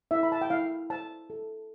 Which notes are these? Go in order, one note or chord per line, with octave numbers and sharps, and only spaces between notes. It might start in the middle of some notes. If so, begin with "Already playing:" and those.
E4 E5
B5
A5
G5
E4 F5
C5 A5
A4